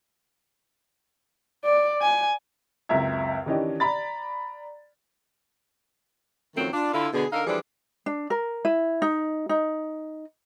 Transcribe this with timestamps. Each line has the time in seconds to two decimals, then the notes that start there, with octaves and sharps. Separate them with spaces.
1.65 D5
2.02 G#5
2.89 C#2 F#2 C4 E5 A#5 G#6
3.46 D#3 E3 C#4 D4 G4 D#5
3.80 D5 A#5 B5 A6
6.56 F#2 D#3 F3 F#3 A3 C4
6.73 D4 F4
6.94 D3 E4 F4
7.13 B2 D3 B3 G#4
7.32 D3 D#4 A4 A#4 F5
7.46 E3 F3 G3 D4 G#4 A4
8.06 D4
8.30 A#4
8.65 E4
9.02 D#4
9.49 D#4